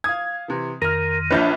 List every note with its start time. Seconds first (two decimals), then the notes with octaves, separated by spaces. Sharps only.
0.04 F5 D#6 G#6
0.48 C3 E3
0.82 F2 D#3 A#4 F6 A#6
1.31 A#1 D4 F4 B4 C#5 D#5 G6